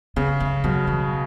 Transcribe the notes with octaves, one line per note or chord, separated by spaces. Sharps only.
C#3 B3
A3
B2 F#3
E3